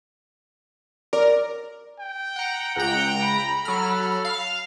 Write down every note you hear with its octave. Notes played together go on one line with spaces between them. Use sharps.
A#4 D5
G5
F#5 A#5
C#2 F#5 G5 A#5
B5
F#3 A4 F6
F5